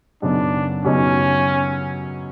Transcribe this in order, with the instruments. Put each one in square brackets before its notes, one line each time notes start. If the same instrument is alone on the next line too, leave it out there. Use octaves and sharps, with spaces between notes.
[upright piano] F#2 C#3 F#3 B3 D#4 [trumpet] D4
[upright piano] F#2 C#3 F#3 B3 D#4 [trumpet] C#4